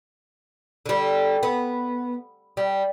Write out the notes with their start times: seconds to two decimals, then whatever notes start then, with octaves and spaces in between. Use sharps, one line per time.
0.86 D3 G3
1.43 B3
2.57 G3